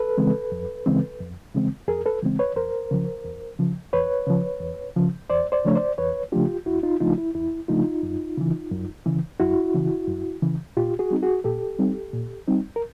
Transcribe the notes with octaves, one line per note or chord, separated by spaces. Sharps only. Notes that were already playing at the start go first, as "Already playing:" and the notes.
Already playing: A4 B4
C#3 E3 G#3 C4
F2
C#3 E3 G#3 C4
F2
C#3 E3 G#3 C4
F2 G#4 A#4
A4 B4
C#3 E3 G#3 C4
B4 C#5
E2 A#4 C5
C#3 F3
E2
C#3 F3
E2 B4 C#5
C#3 F3
E2
C#3 F3
E2 C5 D5
C5 D5
C#3 F3 A3 D4 C#5
C5 D5
E2 B4 C#5
C#3 F3 A3 D4 F4 G4
E2 E4 F#4
D#4 F4
C#3 F3 A3 D4 D#4 F4
E4
E2 E4
C#3 F3 A3 D4 D#4 F4
F#2
C#3 E3
F#2
C#3 E3
F#2 E4 F#4
C#3 E3
F#2
C#3 E3
A#2 F4 G4
F#4 G#4
G3 C4 D#4
F#4 G#4
A#2 G4 A4
G3 C4 D#4
A#2
G3 C4 D#4
A#4